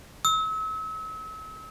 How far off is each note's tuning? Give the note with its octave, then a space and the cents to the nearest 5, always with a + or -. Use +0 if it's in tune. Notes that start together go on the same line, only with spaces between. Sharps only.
E6 -40